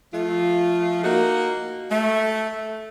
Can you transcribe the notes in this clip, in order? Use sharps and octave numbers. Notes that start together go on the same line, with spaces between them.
F3 A3 F4
A#3 D#4 F#4
A3